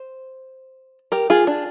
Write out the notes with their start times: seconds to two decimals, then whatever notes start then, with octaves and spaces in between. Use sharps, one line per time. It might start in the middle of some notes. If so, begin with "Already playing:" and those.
Already playing: C5
1.12 G4 A#4
1.30 F4 G#4
1.47 D4